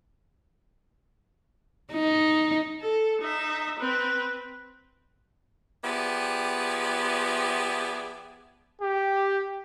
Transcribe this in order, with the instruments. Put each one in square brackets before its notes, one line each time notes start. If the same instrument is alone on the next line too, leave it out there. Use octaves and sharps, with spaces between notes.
[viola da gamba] D#4
[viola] A4
D#4 E5
C4 B4
[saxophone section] F3 B3 G4 G#4 D5 E5
[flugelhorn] G4